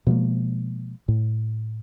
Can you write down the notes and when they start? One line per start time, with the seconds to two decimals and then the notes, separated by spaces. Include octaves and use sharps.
0.07 B2 F3 G#3 A#3
1.08 A2